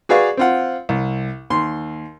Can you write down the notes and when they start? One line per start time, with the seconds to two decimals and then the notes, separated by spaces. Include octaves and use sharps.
0.09 F#4 G#4 B4 D5 F5 C#6
0.37 C4 F4 F#5
0.89 C2
1.50 D#2 C6